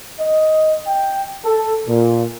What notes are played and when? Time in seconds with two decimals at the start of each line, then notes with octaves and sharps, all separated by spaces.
0.20 D#5
0.87 G5
1.45 A4
1.87 A#2